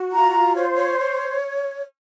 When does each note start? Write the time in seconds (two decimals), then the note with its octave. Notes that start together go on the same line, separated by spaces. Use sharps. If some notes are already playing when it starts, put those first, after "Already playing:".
Already playing: F#4
0.11 F4 A#5
0.55 C5 C#5
0.75 C#5
0.99 C#5